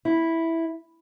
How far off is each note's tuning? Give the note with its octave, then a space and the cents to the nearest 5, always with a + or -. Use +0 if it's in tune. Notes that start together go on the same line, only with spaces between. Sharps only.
E4 -5